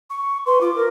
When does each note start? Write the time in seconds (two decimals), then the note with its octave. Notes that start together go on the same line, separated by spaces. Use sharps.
0.10 C#6
0.46 B4 C6
0.61 F4 D6
0.75 A#4